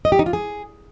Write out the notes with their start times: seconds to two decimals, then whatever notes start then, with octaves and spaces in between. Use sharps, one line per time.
0.05 D#5
0.12 G4
0.19 D#4
0.26 F4
0.33 G#4